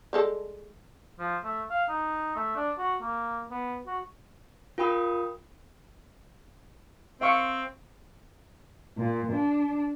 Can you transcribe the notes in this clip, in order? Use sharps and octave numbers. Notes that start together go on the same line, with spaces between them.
G3 G#3 A4
F3
A3
F5
D#4
A3
D4
F#4
A#3
B3
F#4
F4 A#4 G5 B5 D#6
C4 E5 F5 C#6
A#2
D4